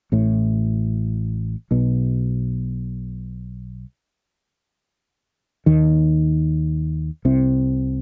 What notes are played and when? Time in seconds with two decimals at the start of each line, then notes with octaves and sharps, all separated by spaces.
0.12 A1 A2
1.71 B1 B2
5.66 D#2 D#3
7.25 C2 C3